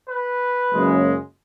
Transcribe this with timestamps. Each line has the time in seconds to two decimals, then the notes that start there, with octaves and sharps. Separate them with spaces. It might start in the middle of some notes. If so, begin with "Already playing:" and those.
0.10 B4
0.71 F#1 F#2 C#3 G#3